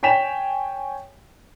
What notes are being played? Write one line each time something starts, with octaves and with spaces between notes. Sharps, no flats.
C#5 G5 G#5 B6 E7 F7